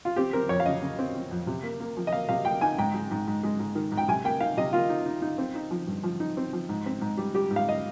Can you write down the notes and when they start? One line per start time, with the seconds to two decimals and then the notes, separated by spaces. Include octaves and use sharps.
0.05 F4
0.16 C4 G4
0.33 C4 A#4
0.49 F2 C#5
0.60 F5
0.66 C#3 D#5
0.82 C#3
0.99 C4
1.15 C4
1.31 F2
1.47 C3
1.63 A#3
1.80 A#3
1.97 F3
2.07 D#5
2.12 A#3 F5
2.29 C3 F5
2.45 A#3 G5
2.61 D#4 G#5
2.78 G#2 G5
2.94 G#3
3.11 G#2
3.27 G#2
3.43 G#3
3.59 G#2
3.75 D#3
3.92 G#2
3.97 G5
4.08 C3 G#5
4.25 A#3 G5
4.41 D#4 F5
4.57 C3 D#5
4.73 A#3 F4
4.89 D#4
5.06 D#4
5.22 D#4
5.38 C4
5.55 D#4
5.71 F3
5.87 G2
6.03 F3
6.20 D#4
6.37 C4
6.53 F3
6.69 G#2
6.86 C4
7.01 G#2
7.17 G3
7.34 G3 G4
7.51 G#2
7.56 F5
7.69 D#5